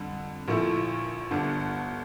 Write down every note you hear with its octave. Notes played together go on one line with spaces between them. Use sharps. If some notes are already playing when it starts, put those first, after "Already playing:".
Already playing: F2 D3 G3
A#1 A#2 F3 A3 E4
G1 G2 D3